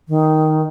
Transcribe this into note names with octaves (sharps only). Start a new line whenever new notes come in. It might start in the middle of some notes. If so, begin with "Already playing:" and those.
D#3